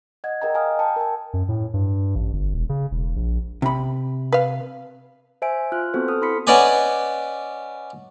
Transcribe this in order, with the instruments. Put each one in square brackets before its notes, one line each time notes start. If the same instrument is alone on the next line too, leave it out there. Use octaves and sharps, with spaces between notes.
[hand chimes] D#5 F#5 G#6
G#4 A#4 D#5 G5 A#5
F5 G5 G#5 A#5 D#6 F6
G5 A5
A#4 G#5
[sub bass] F#2
A2
G2
A1
G1
E1
C#3
E1
A#1
[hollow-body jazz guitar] C3 B5
[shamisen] B4 F5
[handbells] C5 E5 G#5 D7
F4 F6 F#6
B3 C4 F#4 A4 C5
A4 D#6 F6
E4 B5 C6 B6 C#7
[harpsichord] B3 C#4 B4 D5 D#5 G#5